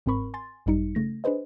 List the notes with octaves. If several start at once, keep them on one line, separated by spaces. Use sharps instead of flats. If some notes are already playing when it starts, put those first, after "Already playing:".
G1 G#2 C4 A#4 B5 C#6
G#5 C6 A6
G#1 F#2 G3 D#4 C#7
C#3 A3 A#6
D4 G#4 B4 C5 D#5